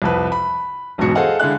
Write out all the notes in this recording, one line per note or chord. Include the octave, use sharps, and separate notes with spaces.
C2 F2 B4
B5
E1 B1 G#2 B2 F#4 C#7
G#4 A4 C5 D#5 F5 F#5
D3 G#3 E4 F5 F#6